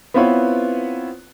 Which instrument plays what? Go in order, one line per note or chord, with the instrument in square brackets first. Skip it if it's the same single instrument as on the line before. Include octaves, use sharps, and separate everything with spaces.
[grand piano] B3 C4 E4 F4 B4 C#5